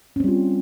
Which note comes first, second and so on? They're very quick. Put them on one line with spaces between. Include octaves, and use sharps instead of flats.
C#4 C4 G3 F4